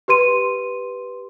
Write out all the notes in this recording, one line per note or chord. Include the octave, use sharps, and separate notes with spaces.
G4 B4 C6 D#7